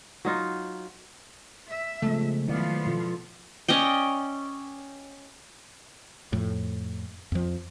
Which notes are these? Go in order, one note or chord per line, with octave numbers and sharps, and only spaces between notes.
F#3 D#4 F4
E5
C#3 F3 G#3 A3 B3 C4
D#3 F3 F#3 B3 E4 D5 F5
B2 F4 A4
C#4 D5 D#5 G5
F2 A2
F2 F3